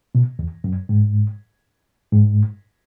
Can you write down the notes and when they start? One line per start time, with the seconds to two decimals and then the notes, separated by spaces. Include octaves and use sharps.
0.15 B2
0.39 E2
0.64 F#2
0.89 G#2
2.12 G#2